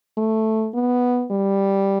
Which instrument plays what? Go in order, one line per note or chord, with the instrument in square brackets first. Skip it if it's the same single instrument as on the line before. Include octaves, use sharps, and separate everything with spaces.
[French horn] A3
B3
G3